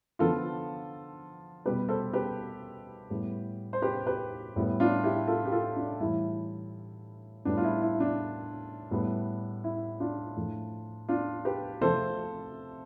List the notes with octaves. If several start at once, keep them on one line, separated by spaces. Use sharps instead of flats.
D3 F3 B3 F4 A4
B2 G3 B3 G4 B4
A4 C5
G4 B4
A2 G3 B3
C5
G4 B4
G4 B4
A2 G3 B3
D4 F4
E4 G4
F4 A4
G4
F4 A4
D4
A2 E3 G3 E4
A2 G3 B3 D4
F4
E4
E4
D4
A2 G3 B3
E4
D4 F4
A2 F3 A3
D4 F4
G4 B4
C3 F3 A3 A4 C5